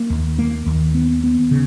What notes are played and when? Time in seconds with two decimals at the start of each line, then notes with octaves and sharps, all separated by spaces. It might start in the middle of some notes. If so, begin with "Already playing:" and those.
Already playing: A#3
0.10 D#2
0.39 A#3
0.66 D#2
0.95 B3
1.24 B3
1.51 C#3